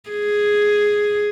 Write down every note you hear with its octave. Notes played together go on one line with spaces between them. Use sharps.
G#4